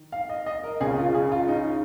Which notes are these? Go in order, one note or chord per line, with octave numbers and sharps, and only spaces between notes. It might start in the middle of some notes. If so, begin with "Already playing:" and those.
Already playing: D#3
F5
D#5
D#5
A#4
C#2 C#3 G#4
F4
G#4
F4
D#4